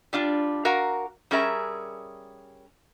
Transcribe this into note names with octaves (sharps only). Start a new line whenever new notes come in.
G3 D4 F4
F#4 A#4 F5
G3 C#4 G#4 A#4 E5